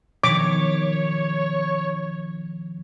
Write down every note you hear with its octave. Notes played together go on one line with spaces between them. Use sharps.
B2 D#3 F3 C#5 D6 B6